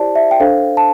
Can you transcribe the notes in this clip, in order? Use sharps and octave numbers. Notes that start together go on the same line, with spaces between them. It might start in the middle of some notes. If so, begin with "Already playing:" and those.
Already playing: E4 G4 C5 D5 A5
E5
G5
D4 A4 C5 F5
A5